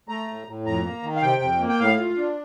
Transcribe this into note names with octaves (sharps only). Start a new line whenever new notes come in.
A3 A#5
A2
A2
F2 A#5
A#3
D#3
F5
C3 G5
F2
A#3
G5
A2 F5
F4
D4